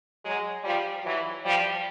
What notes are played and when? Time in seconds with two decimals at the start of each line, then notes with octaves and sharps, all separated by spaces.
0.24 F#3 G#3
0.64 F3 G3
1.04 E3 F#3
1.44 F3 G3